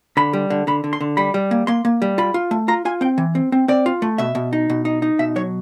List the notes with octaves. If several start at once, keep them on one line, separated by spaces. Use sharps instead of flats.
D3 B5
G3
D3
D3 B5
D3
C6
D3
G3 B5
G3
A#3
A#3 C6
A#3
G3
F4 B5
F4
A3
F4 A#5
F4 G#5
C4 G5
E3
C4
C4
C4 D5
F4
A3
B2 E5
B2
D#4
B2
D#4
D#4
B2 E5
F#3 C#5